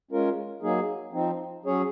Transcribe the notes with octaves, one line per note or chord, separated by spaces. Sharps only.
G#3 C#4 F4 A#4
F#3 A#3 D#4 G#4
F3 C4 D#4
F#3 C#4 G#4 C#5